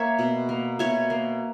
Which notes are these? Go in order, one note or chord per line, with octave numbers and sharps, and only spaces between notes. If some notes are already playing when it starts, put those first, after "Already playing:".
Already playing: A#3 C#5 E5
B2
A#3
B2 C#5 E5
A#3